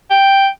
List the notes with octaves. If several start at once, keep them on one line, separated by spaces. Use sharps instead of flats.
G5